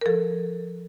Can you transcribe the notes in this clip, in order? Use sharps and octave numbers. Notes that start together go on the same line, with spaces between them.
A#4
F3 A4